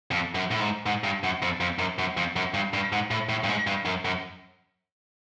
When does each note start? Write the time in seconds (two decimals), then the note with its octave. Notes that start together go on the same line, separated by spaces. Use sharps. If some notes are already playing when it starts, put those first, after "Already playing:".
0.11 F2
0.35 F#2
0.51 A2
0.60 G#2
0.86 G#2
1.04 G2
1.24 F#2
1.42 F2
1.61 F2
1.79 F#2
1.99 F#2
2.17 F2
2.36 F#2
2.54 G2
2.73 G2
2.92 G#2
3.11 A2
3.29 A2
3.44 G2
3.49 G#2
3.67 G2
3.85 F#2
4.05 F#2